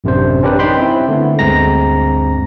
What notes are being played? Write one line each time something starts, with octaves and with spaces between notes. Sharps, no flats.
A1 F#2 C3 D4 C5
C#4 D4 G4 A#4 B4
D#4 D#5 G5 B5 C6
C4 E4
D3 A3 B3
D2 G2 G#3 C4 A#5 A#6